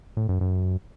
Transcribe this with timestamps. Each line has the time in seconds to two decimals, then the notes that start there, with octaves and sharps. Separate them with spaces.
0.17 A2
0.29 F#2
0.41 F#2